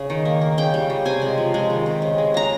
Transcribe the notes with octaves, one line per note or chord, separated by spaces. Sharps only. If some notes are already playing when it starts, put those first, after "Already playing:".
Already playing: C#3
D#3
A#3
A#3
C#3 G5
G3
C#3
C3 G#5
G#3
F3
G#3
D#3
C3
C#3
G#3
C#3 A#5